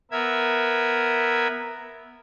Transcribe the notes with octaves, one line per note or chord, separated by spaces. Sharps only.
B3 A#4 E5 G#6